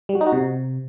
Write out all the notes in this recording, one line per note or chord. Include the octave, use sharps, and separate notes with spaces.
G3
F#4
D#4
F#4
C3